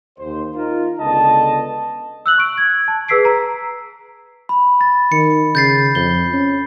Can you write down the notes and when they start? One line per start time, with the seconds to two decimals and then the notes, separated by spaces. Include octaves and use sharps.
0.19 D#2 C5
0.55 D#4 F4 A#4
1.00 C#2 D3 B3 D#5 A5
2.26 E6 F#6 F#7
2.38 C#6 D7
2.57 G#6
2.88 A5
3.08 G#4 B4 E6 B6 C7 D7
3.25 A#5
4.49 B5
4.81 A6
5.12 D#3 C#7
5.55 C#3 G6 A6 C7
5.95 F2 G7
6.33 C#4